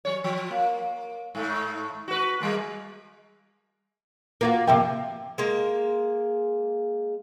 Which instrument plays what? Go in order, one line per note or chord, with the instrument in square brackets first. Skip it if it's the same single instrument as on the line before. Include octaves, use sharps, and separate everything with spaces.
[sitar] F#3 C#5
F3
A#3
G#2 A3
F#4 B4
G3 G#3 A#3
[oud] A#3 F4 F#4
[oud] C3 F3 A#3 [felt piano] E5 G5
[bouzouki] G#3 A#3